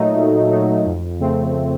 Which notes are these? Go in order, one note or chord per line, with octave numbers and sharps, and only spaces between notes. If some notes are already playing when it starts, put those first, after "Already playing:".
Already playing: A#2 F#3 A3 D#4
A#2
F#3 A3 D#4
F2
C#3 A3 C4